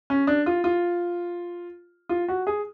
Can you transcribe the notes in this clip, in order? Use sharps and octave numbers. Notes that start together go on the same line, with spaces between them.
C#4
D4
F4
F4
F4
F#4
G#4